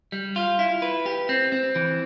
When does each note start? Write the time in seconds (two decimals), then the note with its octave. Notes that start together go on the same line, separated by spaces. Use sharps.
0.12 G3
0.36 F4
0.59 E4
0.82 B4
1.06 G4
1.29 C4
1.52 C4
1.76 E3